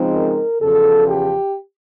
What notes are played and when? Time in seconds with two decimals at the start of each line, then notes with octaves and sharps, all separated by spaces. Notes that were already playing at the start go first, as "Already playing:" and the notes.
Already playing: C#3 F3 G#3 C4 D#4
0.15 A#4
0.61 E2 C#3 F3 A4
1.07 G4